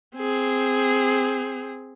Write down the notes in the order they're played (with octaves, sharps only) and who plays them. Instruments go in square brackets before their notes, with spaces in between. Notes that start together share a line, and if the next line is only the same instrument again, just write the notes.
[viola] C4 G#4